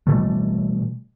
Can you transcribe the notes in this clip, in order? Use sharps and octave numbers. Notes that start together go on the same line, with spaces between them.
B2 E3 G3 A3